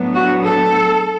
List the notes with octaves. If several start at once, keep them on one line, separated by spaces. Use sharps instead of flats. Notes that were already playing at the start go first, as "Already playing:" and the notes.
Already playing: A2 F#3 B3 D4
F#4
A4